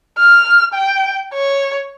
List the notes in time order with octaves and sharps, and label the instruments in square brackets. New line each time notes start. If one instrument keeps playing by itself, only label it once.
[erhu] F6
G5
C#5